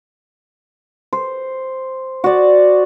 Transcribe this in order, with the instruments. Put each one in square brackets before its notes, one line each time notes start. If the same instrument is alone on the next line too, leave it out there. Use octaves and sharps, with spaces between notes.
[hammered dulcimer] C5
F#4 D5